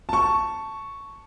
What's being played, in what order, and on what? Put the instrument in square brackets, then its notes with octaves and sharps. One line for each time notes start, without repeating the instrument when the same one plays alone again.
[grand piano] A5 C#6